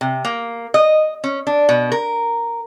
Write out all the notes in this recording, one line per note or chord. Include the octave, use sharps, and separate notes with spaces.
C3
A#3
D#5
C#4
D4
B2
A#4